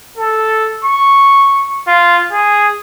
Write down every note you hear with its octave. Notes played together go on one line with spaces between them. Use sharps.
A4
C#6
F4
G#4